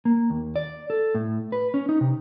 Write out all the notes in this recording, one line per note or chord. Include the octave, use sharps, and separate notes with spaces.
A#3
D#2
D5
A4
A2
B4
C#4
D#4
C3